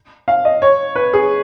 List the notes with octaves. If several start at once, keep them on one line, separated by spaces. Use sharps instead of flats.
F5
D#5
C#5
B4
G#4